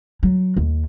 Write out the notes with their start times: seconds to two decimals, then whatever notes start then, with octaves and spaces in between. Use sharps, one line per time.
0.23 F#3
0.57 D#2